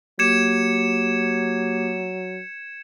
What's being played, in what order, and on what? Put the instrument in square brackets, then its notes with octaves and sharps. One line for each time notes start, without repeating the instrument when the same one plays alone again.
[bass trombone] F#3 [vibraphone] A#3 G4 D6 [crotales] G#6 C#7 E7